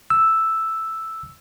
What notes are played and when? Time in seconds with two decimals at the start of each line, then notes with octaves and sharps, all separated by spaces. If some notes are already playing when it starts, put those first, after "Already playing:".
0.10 E6